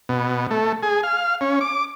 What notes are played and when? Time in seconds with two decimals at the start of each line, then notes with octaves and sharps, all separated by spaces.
0.09 B2
0.51 A3
0.83 G#4
1.03 F5
1.41 C#4
1.61 D6